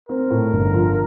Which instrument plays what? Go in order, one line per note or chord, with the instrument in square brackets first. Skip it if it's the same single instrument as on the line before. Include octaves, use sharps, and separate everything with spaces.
[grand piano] C4 [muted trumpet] A#4
[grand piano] A2
G1
F3